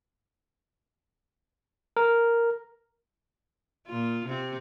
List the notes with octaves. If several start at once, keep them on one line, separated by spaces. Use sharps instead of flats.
A#4
A#2 F4
C3 C4